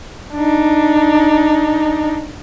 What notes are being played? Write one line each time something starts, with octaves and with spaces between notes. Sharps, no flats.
D4 D#4